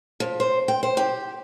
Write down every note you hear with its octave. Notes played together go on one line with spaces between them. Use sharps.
F3
C5
G5
C5
G4